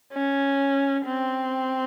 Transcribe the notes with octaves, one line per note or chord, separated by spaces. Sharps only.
C#4
C4